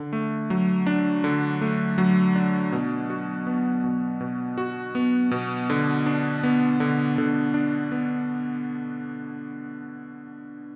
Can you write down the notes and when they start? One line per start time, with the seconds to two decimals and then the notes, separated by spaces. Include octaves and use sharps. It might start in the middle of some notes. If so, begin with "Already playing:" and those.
Already playing: D3
0.13 A3
0.50 F#3
0.86 D4
1.24 D3
1.61 A3
1.98 F#3
2.35 D4
2.72 B2
3.10 F#4
3.47 B3
3.84 B2
4.21 B2
4.58 F#4
4.95 B3
5.31 B2
5.70 D3
6.06 D4
6.43 B3
6.80 D3
7.18 D3
7.54 D4
7.92 B3